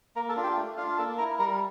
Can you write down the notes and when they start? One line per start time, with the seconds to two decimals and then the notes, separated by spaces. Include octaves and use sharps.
0.16 A#3 A#4 A#5
0.29 A4 A5
0.36 D4 F4
0.43 G4 G5
0.57 A3
0.77 D4 F4 F5
0.97 A#3 A4 A5
1.18 E4 A#4 A#5
1.39 G3 A#4 A#5